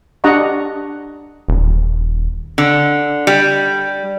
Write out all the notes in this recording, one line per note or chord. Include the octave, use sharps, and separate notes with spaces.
D4 G4 D#5 F#5 A#5 C#6
D#1
D3
G3